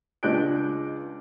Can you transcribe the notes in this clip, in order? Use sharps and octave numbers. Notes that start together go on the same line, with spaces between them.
C#2 D4 D#5 F#6 G6 D7